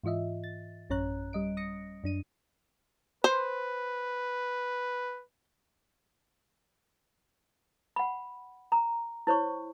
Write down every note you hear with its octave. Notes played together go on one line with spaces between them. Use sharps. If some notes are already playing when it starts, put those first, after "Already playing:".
G#2 E3 F4 D#5 E5
A6
A1 F#2 C#4 C#5 A#5 F#6
G3 D#5 D7
D#6 A#6 C#7
F#2 D4 D#7
B4 C5
F#5 B5
A#5
E4 C5 C#5 C#6